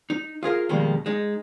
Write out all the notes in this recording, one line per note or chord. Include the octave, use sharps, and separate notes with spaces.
D#4
F4 G#4 A#4 F5
F2 B2 D#3 G3 G#3 A#3
G#3 D#4